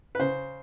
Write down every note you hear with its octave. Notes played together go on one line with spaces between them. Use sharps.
B4
C#3 C5